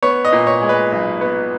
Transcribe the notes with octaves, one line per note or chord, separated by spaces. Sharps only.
B3 C#5
D#5
A#2
C#5
G#3
B4
B1
B3